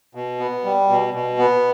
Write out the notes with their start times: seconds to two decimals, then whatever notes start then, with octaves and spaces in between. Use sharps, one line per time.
0.15 B2
0.39 B3
0.64 G3
0.90 B2
1.14 B2
1.39 B3